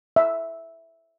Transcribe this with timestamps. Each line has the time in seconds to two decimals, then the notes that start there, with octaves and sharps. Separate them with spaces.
0.16 E5